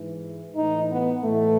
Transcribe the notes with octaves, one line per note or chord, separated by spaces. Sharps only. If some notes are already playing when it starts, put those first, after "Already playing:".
Already playing: G#2 E3
A2 E3 D#4
B3
A2 E3 A3